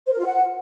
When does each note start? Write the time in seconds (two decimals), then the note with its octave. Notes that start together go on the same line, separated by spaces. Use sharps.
0.06 C5
0.13 A#4
0.19 F4
0.26 F#5